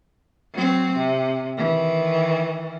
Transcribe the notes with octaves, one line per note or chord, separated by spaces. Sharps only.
F#3 C4
C3
D#3 E3